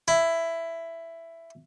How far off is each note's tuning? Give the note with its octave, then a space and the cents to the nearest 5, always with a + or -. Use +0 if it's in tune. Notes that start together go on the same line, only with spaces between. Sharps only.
E4 +10